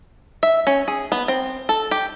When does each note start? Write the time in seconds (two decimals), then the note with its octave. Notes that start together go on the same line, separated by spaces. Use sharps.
0.43 E5
0.67 C#4
0.88 G#4
1.12 B3
1.28 C4
1.69 A4
1.91 G4